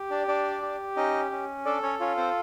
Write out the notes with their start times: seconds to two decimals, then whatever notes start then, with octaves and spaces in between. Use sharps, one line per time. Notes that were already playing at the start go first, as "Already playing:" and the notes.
Already playing: G4
0.11 D4 D5
0.28 D4 D5
0.62 G4
0.97 C#4 D#4 D#5
1.31 C#4
1.65 D4 A4 D5
1.83 C#4 C#5
2.00 C#4 F4 C#5
2.17 C4 C5